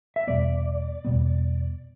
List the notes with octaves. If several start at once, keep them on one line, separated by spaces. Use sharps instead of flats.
E5
E2 B2 G3 B3 D5
E2 B2 G3 B3